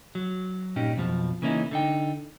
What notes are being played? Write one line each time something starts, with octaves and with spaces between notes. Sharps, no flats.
F#3
G2 A#2 C#4 D#4 G4
B1 F2 B2 F3
C#3 E3 A#3 C#4 D#4 E4
D3 D#4 G5